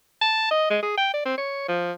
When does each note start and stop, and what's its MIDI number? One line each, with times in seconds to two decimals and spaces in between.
0.21 0.49 81
0.51 0.65 75
0.70 0.78 56
0.82 0.97 68
0.97 1.09 79
1.14 1.25 74
1.25 1.37 60
1.38 1.64 73
1.68 1.92 53